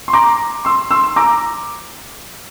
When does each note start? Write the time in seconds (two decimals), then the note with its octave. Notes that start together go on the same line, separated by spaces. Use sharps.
0.08 C6
0.13 A#5 D6
0.65 C6 E6
0.91 C6 E6
1.16 A#5 D6